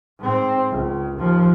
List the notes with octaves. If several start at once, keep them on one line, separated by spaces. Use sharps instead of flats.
G#2 C4
C#2
D#2 F3